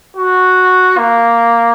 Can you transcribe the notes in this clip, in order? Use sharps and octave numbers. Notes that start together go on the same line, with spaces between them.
F#4
A#3